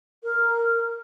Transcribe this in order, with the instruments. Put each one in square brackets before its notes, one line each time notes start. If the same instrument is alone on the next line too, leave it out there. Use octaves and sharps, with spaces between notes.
[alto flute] A#4